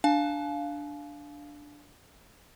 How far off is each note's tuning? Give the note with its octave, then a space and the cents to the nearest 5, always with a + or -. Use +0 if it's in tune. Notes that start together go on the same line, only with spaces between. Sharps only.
D4 +0 F5 +0 G#5 +45